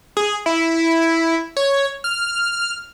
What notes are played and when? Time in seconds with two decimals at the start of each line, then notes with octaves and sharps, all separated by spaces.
0.17 G#4
0.46 E4
1.57 C#5
2.04 F6